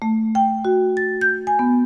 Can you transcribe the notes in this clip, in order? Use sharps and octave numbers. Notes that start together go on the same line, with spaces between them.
A3
G5
F#4
A6
G6
G#5
B3